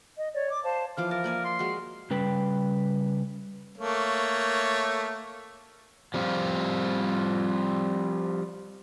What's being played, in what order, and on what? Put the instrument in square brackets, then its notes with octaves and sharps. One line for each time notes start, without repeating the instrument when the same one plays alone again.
[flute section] D#5
C#5 D5
D6
C5 F5 A5
[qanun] E3 F3 D6 [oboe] F5
[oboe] A#4 [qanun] A5
[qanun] A#3 D5 G#5
[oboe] C6
[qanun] G#3 F#4
[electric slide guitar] C#3 G3 B4 G5
[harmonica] A3 A#3 C#5
[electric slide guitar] F3 G3 C4 F4